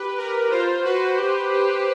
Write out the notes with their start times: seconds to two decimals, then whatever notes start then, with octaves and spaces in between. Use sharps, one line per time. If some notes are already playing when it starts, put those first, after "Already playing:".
Already playing: G4 B4
0.18 A#4
0.51 F4 C5
0.84 F#4 B4
1.18 G4
1.52 G4